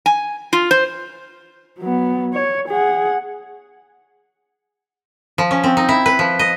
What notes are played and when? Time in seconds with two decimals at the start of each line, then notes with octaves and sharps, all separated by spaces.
0.06 G#5
0.53 F4
0.71 C5
1.79 F#3 B3
2.33 C#5
2.69 G#4 F#5
5.38 F3
5.51 C#4
5.64 C4
5.77 D#4
5.89 E4
6.06 B4
6.19 F3
6.39 D#5